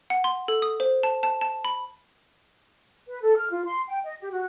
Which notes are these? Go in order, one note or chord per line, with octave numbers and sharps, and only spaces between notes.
F#5
C6
A4
D#6
C5
A5
A5
A5
B5
B4
A4
F6
F4
C6
G5
D#5
G4
F#4